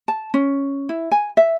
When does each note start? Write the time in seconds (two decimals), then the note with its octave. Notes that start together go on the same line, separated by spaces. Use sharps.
0.08 A5
0.34 C#4
0.89 E4
1.11 G#5
1.37 E5